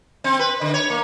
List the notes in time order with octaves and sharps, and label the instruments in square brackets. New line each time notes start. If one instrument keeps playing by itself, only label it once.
[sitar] C4
B4
D3
C#5
A#3